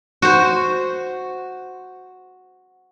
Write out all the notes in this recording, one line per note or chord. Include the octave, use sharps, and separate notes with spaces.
F#4 C5